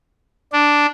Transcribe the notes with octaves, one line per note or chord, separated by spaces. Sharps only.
D4